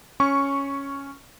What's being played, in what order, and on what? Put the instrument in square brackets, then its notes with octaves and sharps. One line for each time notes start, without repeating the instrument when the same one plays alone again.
[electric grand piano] C#4 C#6